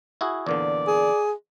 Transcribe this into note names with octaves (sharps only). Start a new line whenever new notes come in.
E4 F#4 G#4
E2 A#2 D3 D5
G#4